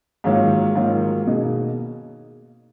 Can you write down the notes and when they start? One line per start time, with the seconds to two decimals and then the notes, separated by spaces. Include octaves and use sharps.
0.24 G#2 D#3 F#3 A#3 F4
0.75 G#2 D#3 F#3 A#3 F4
1.27 B2 A#3 D#4 G#4 D#5